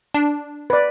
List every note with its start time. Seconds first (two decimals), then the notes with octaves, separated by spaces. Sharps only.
0.14 D4
0.70 B4 D5